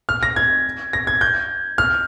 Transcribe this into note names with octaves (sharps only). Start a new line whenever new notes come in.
F6
A#6
G#6
A#6
G#6
G6
F6